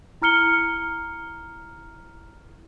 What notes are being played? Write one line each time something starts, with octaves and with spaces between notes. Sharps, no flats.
E4 A#5 F6 C#7 G7